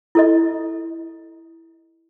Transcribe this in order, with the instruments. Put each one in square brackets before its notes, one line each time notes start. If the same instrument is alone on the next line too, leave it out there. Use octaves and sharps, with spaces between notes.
[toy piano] E4 A4 D#5